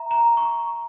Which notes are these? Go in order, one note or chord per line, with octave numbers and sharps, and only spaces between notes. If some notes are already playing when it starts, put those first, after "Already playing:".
Already playing: E5 A#5
A#5
C#6